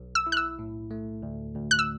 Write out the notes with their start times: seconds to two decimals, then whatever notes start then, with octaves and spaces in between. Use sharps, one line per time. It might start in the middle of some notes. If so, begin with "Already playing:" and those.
Already playing: B1
0.15 E6
0.27 E4
0.32 F#6
0.37 E6
0.59 A2
0.91 A3
1.23 D2
1.55 D2
1.71 F#6
1.79 E6